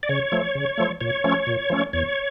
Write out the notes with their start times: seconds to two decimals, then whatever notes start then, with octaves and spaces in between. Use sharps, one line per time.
0.03 D5
0.09 C#3 C#5
0.32 F3 A3
0.55 C#3
0.78 F3 A3
1.01 A#2 C#5
1.24 F3 A3 C#4
1.47 A#2
1.70 F3 A3 C#4
1.93 E2 C#5